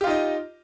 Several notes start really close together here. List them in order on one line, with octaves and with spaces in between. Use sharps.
G4 F4 D#4 D#5